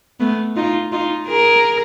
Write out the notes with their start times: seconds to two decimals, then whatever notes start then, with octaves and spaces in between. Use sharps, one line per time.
0.20 A3 B3
0.56 D#4 F4
0.92 D#4 F4
1.28 G#4 A#4